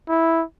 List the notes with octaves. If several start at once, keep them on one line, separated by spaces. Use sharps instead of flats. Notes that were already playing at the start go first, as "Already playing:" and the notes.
E4